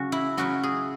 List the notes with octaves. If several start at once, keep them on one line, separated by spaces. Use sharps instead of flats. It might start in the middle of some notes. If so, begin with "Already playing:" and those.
Already playing: C#3 F#3 C#4 F#4
E4
C#3 F#3 C#4 E4 F#4
G#4